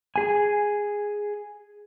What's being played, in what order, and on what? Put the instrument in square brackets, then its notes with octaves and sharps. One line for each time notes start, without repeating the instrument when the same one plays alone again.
[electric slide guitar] G#4 G#5